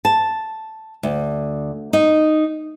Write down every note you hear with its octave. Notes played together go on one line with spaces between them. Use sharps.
A5
D2
D#4